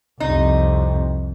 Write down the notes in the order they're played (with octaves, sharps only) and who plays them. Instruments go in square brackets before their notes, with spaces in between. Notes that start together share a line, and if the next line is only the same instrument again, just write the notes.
[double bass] C2 F2 [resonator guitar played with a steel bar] D#4